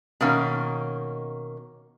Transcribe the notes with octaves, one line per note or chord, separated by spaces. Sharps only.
B2 D#3 A#3 C#4